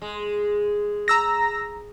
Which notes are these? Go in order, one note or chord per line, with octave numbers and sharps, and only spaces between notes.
G#3
A#5 E6 A#6